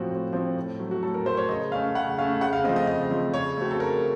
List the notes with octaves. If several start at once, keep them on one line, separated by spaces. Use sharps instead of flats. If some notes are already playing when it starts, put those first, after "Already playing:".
Already playing: A2 F3 C4 F#4
A2
F3 C4
A2
F#3 A3
F#4
A2 A4
A#4
F#3 A3 C5
C#5
C#3 D#5
A3 C#4 F5
C#3 F#5
A3 C#4 F5
C#3 F#5
F5
F3 A3 C4 D#5
D#5
C#3 D#5
F3 A3 C4
C#3 C#5
A3 C4 F#4
A4
C#3 A#4